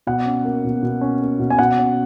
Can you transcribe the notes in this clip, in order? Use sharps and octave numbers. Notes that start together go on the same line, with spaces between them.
B2 F#5
C#4
A#3
B2
B2
C#4
A#3
B2
G#5
B2 F#5
C#4